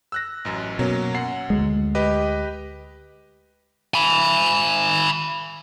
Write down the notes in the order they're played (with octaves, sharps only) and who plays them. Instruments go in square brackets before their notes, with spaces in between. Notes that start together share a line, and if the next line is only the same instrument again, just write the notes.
[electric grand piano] E6 F#6 A#6
A1 F#2
[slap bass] B2 [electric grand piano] F#3 A#3 C#4
[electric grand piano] F#2 F#5 C7
[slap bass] D2 G#3
[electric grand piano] G4 B4 D#5
[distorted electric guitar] G#5 B5